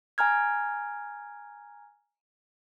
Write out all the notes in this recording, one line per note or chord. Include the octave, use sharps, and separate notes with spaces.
G#5 A#5 F6 G#6